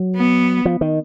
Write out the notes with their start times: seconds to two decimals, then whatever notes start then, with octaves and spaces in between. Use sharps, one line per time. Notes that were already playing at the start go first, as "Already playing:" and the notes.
Already playing: F#3
0.16 B3
0.65 F3
0.81 D#3